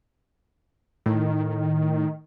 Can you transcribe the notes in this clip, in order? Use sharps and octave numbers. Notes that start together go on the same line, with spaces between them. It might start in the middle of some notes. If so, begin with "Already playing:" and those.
A2 D#3